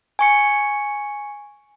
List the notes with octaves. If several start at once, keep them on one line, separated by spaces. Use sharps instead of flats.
G#5 C#6 C#7